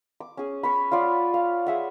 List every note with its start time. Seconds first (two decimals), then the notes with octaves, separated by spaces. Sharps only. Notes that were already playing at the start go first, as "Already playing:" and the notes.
0.20 D6
0.37 C#4 G#4
0.63 C#4 C#5 B5
0.91 F4 C#5 D5 F#5
1.34 F5
1.67 G#4 E5 F#5